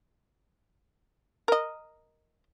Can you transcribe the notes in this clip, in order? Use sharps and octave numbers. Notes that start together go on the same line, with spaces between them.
A#4 D#5